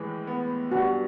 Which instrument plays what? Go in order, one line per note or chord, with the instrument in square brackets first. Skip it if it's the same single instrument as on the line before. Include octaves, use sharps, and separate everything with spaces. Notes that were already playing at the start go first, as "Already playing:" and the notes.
Already playing: [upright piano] A2 E3 G#3
B3
[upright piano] G2 [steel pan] F#4